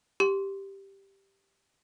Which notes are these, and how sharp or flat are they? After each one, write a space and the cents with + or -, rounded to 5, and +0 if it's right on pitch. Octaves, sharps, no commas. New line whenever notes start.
G4 +0 C6 +0